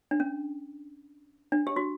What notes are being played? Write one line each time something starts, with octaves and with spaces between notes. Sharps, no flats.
D4
C#4
D4
G4
F#4